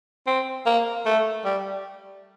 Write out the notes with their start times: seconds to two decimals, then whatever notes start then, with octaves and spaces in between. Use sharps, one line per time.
0.27 C4
0.65 A#3
1.05 A3
1.45 G3